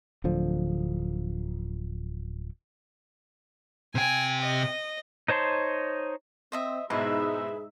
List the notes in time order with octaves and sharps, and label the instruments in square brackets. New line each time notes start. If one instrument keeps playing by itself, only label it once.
[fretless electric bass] D1 D3 F3
[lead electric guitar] C3 G5 [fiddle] G#5
[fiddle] D#5
[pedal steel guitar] D#4 C5 C#5 A5 C6
[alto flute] C4 [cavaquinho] C5 D#5 E5
[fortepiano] G#2 B2 [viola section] G#3 D#4 E5 [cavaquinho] E4 B4 [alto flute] G#4